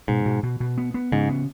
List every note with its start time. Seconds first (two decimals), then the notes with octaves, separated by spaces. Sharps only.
0.08 G#2 B2
0.26 B2
0.43 B2
0.60 B2
0.78 B3
0.94 B3
1.12 G#2 C#3
1.29 B3